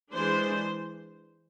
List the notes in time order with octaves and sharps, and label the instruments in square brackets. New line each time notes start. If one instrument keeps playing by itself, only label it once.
[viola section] E3 G#3 D4 C5